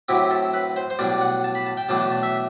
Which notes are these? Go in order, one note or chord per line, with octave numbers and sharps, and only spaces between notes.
A2 F#3 C4 E4 G4
A4
B4
C5
C5
B1 A2 G3 D4 D5
F#5
A5
B5
A5
G5
B1 A2 E3 A3 D4 A5
A5
A5
E5